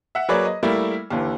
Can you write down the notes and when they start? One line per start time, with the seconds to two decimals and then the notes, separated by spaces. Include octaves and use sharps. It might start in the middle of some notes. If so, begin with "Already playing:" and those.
0.15 E5 F#5
0.29 F#3 A#3 G#4 B4 C#5 D5
0.45 D#5
0.63 G3 A3 A#3 E4
1.10 D#2 D3 E3